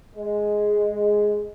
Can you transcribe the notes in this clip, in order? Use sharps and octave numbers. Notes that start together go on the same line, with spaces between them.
G#3